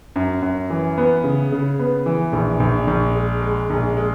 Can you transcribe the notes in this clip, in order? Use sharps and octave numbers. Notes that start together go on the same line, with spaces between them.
F#2
F#2
E3
B3
C#3
C#3
B3
E3
A#1
A#1
A#1
G#3
G#3
A#1
G#3